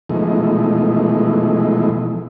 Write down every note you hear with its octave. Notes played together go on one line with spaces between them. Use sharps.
B2 E3 F3 G#3 A3 D#4